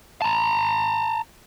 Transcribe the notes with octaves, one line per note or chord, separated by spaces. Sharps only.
A5 A#5